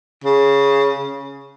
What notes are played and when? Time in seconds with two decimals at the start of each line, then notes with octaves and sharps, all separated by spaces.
0.25 C#3